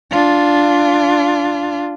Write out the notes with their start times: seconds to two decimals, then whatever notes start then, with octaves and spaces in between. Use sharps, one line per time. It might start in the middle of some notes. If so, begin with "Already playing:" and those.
0.11 D4 F4